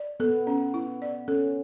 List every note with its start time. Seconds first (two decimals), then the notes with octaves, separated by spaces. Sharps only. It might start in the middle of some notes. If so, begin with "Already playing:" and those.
Already playing: D5
0.20 B3 A4
0.47 C#4
0.74 E4
1.02 D5
1.28 C#4 A4